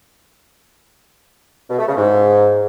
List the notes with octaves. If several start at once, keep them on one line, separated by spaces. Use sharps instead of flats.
B2
A3
C#3
G#2